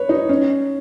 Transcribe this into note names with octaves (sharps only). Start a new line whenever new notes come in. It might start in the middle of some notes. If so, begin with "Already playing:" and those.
Already playing: B4 C#5
D#4
C#4